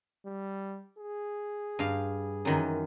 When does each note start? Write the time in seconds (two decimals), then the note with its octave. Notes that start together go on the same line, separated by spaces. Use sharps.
0.26 G3
0.99 G#4
1.79 G2 F5
2.45 F#2 D#3 E3